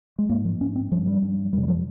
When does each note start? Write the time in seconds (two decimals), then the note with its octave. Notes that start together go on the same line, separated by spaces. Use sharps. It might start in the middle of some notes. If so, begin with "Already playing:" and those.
0.18 G#3
0.29 G#2 A#3
0.45 F3
0.61 G#2 C#4
0.76 C4
0.92 G2 F3
1.07 G3
1.23 G2
1.53 F2 C3 G3
1.63 G3
1.68 F3